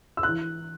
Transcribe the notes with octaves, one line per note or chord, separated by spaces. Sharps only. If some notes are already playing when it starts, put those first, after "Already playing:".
E6
E3 F#6